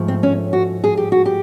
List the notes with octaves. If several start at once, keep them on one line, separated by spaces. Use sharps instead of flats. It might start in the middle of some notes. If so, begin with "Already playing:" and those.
Already playing: G#2 F3 A3
C4
C#4
F#4
G#4
G4
F#4
G4